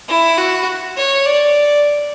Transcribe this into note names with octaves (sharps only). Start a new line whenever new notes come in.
E4
F#4
C#5
D5